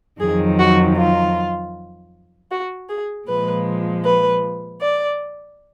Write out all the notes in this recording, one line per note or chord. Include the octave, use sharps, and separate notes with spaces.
F2 D#3 F#3 G#4
F#4
F4
F#4
G#4
A#2 F3 G#3 B4
B4
D5